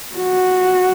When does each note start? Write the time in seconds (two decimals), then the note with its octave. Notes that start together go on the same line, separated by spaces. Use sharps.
0.16 F#4